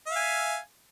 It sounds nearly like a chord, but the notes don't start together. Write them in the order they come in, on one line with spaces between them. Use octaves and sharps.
E5 F5 G#5